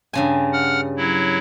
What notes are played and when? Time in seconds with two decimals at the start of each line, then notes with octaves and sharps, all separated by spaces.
0.13 G2 C#3 G#5
0.53 F#5 F6
0.97 F#3 E4